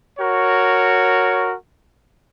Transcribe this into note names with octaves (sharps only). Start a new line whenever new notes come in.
F#4 A#4 C#5